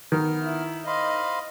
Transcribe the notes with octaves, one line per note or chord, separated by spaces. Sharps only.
D#3 B3 F6
E4
C5 D#5 F5 B5